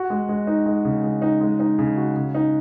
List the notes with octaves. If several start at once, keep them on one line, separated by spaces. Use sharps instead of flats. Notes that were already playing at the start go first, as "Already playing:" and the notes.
Already playing: F#4
G#3
G#3
D#4
G#3
C#3
G#3
D#4
G#3
D#4
C#3
F#4
C#3
D#4